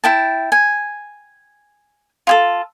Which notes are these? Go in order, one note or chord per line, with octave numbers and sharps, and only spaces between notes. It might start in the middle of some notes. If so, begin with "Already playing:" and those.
E4 G5 A5
G#5
F4 G#4 A4